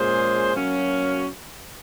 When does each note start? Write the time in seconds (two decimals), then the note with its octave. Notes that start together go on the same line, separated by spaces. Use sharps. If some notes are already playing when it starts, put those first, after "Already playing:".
Already playing: A#2 G#3 C#4 G#4 C5
0.53 F#3 A#3 C#4 F#4